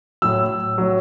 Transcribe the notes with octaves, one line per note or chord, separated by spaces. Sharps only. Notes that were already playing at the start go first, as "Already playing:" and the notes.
A2 F#3 E6
A2 F#3